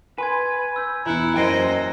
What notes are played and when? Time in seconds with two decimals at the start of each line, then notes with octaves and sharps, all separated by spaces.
0.18 B4 G#5 C6 G#6
0.76 E6 G6
1.06 E2 E3 E4 A#5 F#6 C#7
1.36 F#2 A#2 C5 D#5 G5 G#6 C7